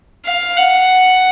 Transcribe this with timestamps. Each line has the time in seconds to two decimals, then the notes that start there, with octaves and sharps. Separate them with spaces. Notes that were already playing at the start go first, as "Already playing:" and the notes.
0.25 F5
0.56 F#5